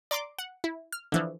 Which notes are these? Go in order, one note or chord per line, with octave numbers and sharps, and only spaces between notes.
D5 A#5 C6 D6
F#5
E4
F6
D3 E3 F3